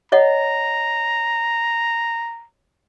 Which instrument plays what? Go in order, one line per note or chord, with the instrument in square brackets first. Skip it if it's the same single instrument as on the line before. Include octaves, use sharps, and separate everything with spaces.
[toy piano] C#5 D#5 F#5 [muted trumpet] A#5